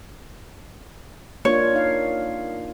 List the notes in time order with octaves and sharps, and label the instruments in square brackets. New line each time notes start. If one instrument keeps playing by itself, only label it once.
[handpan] A#3 D4 F4 [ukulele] C#5
[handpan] D#4 F5